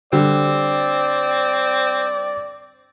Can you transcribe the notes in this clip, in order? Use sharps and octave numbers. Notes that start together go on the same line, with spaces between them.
D3 G3 C4 D5